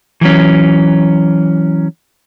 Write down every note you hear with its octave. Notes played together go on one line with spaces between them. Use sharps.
E3 F#3 C#4